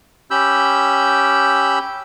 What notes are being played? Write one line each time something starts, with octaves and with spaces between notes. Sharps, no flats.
C#4 G4 B5 E6 G6